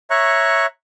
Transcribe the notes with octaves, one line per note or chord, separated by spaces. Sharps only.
C#5 E5 A#5 C#6 F#6